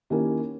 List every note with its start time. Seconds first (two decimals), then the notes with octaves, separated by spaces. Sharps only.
0.10 D#3 A#3 C#4 E4 G4